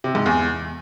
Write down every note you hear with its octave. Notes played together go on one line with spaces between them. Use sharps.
C3
G#2
E2